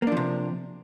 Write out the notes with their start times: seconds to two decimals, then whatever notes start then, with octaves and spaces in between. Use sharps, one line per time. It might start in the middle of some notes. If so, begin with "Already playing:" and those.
0.02 A#3
0.07 D4
0.12 F3
0.17 C3